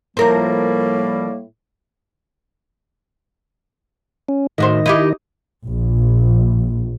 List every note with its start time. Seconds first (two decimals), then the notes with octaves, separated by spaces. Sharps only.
0.17 A2 F3 G3 A#3 A#4 C5
4.29 C#4
4.58 A2 D#3 F#4 C5 D#5
4.86 D#4 E4 G4
5.66 A#1